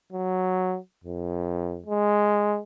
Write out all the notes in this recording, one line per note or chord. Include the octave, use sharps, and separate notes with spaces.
F#3
F2
G#3